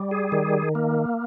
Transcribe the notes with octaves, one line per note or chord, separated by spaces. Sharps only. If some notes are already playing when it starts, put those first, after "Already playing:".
Already playing: G3
G#4
D#3
A#3